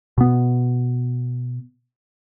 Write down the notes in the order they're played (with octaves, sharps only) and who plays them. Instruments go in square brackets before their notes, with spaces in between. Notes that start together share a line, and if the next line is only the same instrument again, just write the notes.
[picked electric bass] B2 B3